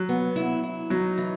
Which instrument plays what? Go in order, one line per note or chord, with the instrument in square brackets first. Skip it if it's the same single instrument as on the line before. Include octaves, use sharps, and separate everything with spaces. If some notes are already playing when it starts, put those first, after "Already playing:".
Already playing: [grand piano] F#3
[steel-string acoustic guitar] B3
E4
E4
[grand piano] F#3 [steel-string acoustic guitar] D#4
[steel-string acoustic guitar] E3